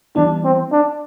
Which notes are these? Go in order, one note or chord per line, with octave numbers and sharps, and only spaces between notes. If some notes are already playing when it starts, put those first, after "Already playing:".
E3 G3 B3 D4 E4
C4
D4